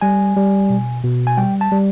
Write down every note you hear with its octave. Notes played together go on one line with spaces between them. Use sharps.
G3 G#5
G3
B2
B2
G#5
G3 G5
A5
G3